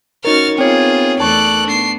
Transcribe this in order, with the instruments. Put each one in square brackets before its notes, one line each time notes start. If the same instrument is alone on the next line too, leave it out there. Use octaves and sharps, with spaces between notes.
[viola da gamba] C#4 F#4 C#5 [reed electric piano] D#4 A#4 [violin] F6 A6
[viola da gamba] B3 F4 [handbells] C4 C#5 [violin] G#4
[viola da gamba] E2 A3 A4 [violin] D5 F#6 [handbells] A5 C#6
[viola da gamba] B3 [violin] D4 C7